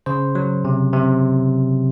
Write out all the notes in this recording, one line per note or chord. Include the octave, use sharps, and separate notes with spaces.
C#3 C5
F#3
C3
C3